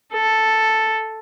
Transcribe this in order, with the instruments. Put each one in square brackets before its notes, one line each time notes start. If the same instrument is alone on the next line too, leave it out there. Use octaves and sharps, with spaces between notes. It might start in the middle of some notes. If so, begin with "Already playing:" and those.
[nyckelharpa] A4